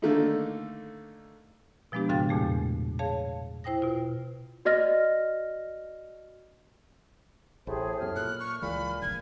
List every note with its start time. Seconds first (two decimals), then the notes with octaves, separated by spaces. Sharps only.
0.02 D3 D#3 A3 A#3 D4 D#4
1.92 B2 F3 G#3 B3 D4 G4
2.09 G#2 C#3 F#4 F5 G5 A6
2.29 E2 A#2 A3 G#4
2.99 G#4 C#5 F5 A5
3.64 E4 C5 G5 D#6 A#6
3.82 B2 F4
4.65 F#4 D5 D#5 F6 A#6
7.67 A1 A2 G4 G#4 C5
8.00 F#2 B2 F6
8.16 A#2 F#6
8.40 C#6
8.62 C#2 A#2 E3 G#3 B5
9.02 F1 A#1 G#6